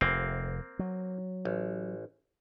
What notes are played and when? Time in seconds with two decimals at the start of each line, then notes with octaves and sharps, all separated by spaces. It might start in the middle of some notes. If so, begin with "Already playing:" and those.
0.01 F1 A#3 C4
0.79 F#3
1.45 A1